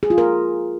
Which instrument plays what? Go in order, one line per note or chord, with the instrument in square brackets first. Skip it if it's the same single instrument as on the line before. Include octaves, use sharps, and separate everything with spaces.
[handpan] G#4
F4
A#4